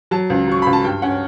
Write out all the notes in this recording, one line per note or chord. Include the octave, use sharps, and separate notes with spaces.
F#3 A5
C#2
F#3 C#6
C#2 B5
A5
G2 G5
C#4 F#5